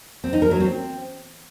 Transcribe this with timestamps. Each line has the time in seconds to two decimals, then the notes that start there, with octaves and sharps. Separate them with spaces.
0.24 C4
0.33 D#4
0.42 A#4
0.51 F#3
0.60 C4